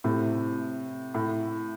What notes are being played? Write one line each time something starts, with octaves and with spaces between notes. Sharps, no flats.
A2 C3
A2